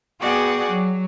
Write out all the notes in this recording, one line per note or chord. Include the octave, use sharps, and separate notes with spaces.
B3 F#4 G#4 D5 F#5 G5
F#3